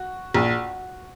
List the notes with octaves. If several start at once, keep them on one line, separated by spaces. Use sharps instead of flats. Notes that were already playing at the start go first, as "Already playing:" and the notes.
Already playing: F#4
A#1